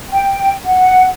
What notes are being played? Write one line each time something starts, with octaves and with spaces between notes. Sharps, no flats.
G5
F#5